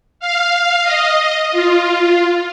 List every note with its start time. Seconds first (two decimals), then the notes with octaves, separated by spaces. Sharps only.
0.20 F5
0.83 D#5
1.51 F4